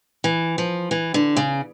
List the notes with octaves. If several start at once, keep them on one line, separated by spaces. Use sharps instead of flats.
E3
F3
E3
D3
C#3